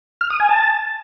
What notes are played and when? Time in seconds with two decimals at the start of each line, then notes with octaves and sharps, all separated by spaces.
0.21 F6
0.30 D#6
0.40 G#5
0.49 A5